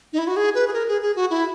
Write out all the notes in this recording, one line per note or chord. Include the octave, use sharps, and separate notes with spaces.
D#4
E4
F#4
G#4
B4
G#4
A#4
G#4
G#4
F#4
E4